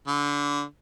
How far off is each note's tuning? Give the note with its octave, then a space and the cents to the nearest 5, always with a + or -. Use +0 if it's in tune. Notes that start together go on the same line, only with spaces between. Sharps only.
D3 -25